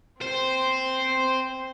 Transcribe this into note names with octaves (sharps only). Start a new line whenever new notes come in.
C4 C5